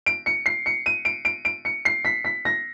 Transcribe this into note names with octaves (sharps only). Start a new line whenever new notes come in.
D7
C#7
C7
C#7
D#7
D7
D7
D7
C#7
C7
B6
B6
A#6